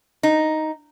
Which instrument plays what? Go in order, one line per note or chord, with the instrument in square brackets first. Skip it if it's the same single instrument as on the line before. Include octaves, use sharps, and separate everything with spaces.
[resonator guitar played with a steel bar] D#4